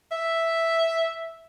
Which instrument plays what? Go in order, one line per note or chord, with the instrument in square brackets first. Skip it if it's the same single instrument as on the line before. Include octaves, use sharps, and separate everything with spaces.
[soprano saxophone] E5